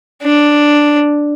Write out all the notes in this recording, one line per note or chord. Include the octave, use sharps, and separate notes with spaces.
D4